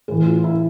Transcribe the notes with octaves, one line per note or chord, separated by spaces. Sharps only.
A2 E3 G#4
F4
E4